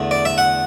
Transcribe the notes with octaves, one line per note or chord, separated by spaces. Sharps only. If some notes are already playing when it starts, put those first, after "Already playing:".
Already playing: E2 D3 A3
D5
E5
F#5